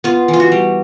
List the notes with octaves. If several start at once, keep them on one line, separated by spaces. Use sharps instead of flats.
B3 F4
E3
F4
F#4
G3